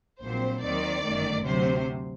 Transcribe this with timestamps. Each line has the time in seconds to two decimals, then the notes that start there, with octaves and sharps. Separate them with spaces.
0.21 A#1 A#2 F#3 C4 C5
0.62 D#2 D#3 F#3 C4 D5
1.04 G1 F#2 D#3 A3
1.45 D2 C3 F#3 C5